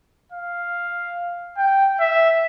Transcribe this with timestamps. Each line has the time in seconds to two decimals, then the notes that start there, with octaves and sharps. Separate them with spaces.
0.32 F5
1.58 G5
2.00 E5